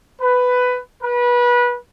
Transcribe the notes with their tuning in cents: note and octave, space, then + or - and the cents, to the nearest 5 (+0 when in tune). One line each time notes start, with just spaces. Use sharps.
B4 +10
B4 -25